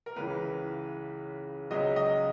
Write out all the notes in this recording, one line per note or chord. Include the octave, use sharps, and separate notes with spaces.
A#4
C#2 C#3 E3 B4
C#2 C#3 F#3 D#5
D#5